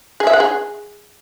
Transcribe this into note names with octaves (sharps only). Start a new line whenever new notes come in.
G#4
E5
F#5
G#4